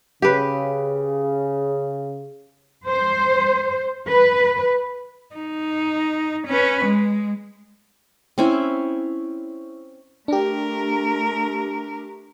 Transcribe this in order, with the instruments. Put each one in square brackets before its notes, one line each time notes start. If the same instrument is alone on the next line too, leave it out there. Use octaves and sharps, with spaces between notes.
[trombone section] C#3 [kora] G4 B4
[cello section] C5
B4
[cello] D#4
C#4 B4
G#3
[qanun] C4 C#4 E4
[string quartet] A3 A#4 [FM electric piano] D4 G4